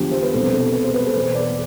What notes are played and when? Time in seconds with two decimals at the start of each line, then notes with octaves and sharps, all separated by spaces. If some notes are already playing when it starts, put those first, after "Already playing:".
Already playing: E2 D3 F3 G4
0.11 C5
0.23 B4
0.33 C2 B2 A4
0.54 A4
0.73 B4
0.84 C5
0.94 B4
1.07 A4
1.15 E2 B2 B4
1.35 D5